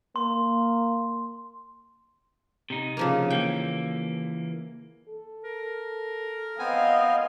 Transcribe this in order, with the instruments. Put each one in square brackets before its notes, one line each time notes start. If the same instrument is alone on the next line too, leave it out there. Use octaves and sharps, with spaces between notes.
[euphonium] A#3 [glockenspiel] C6
[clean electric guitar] C3 D#4
[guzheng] C#3 F3 A#3
[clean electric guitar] E3 A#3 [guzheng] G5
[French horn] A4
[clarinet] A#4
[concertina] B3 C4 G#5 [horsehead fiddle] D#5 F5